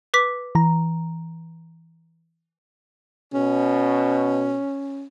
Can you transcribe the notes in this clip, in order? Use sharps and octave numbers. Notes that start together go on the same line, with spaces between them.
B4 D6 B6
E3 A#5
B2 C#4